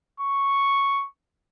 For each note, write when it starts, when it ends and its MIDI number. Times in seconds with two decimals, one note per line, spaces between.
0.20 1.05 85